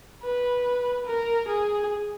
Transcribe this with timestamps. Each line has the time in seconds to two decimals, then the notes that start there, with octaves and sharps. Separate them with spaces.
0.22 B4
1.07 A#4
1.48 G#4